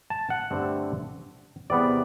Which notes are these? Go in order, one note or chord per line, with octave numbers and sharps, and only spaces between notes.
A5
F#5
G2 D3 A3 C4
E2 C3 G3 B3 D5